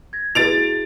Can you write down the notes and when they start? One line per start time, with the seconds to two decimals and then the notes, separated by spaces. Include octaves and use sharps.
0.13 G#6 A#6
0.35 E4 F#4 G#4 A6 D7 F7